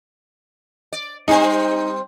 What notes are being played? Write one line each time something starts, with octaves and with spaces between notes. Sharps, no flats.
D5
G3 C4 D#4 C5